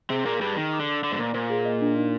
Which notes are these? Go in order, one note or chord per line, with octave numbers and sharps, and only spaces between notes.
C3 C4 G#4
A#2 A#3 G#4
G2 G3 G#4
D#3 G#4
D6
D3
D6
D3 D6
G#2
A#2 C5
A#2 C5
G#4
D#5
D4
D#4